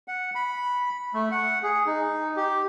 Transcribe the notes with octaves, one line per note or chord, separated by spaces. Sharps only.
F#5
B5
A3
F#5
G#4
D#4
G4